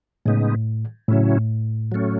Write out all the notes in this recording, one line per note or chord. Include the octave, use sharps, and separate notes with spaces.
A2 C#3 G#3 B3 D#4
A2 C#3 F#3 C#4 E4
F#3 A3 C#4